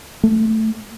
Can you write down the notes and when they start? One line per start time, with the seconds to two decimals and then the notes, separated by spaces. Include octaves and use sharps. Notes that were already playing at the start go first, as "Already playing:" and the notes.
0.23 A3